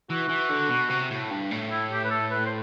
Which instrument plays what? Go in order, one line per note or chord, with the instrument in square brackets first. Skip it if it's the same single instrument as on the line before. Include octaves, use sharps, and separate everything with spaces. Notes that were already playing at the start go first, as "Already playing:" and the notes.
[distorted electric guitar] E3 [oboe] F#4
[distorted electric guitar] E3
D3
B2
C3
A2
G2
A2
[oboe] E4
G4
B4
A4
B4
C5